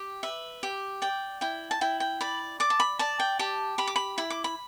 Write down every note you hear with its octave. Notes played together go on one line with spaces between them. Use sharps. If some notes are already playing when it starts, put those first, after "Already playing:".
Already playing: G4
B4 E5
G4
D5 G5
E4 G5
A5
E4 G5
G5
D5 B5
D5 D6
A5
B5
D5 A5
G5
G4 A5
G4 B5
D6
B5
E4 B5
D6
B5